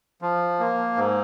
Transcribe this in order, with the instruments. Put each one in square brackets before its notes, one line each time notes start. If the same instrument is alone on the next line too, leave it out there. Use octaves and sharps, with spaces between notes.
[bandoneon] F3
A#3
G#2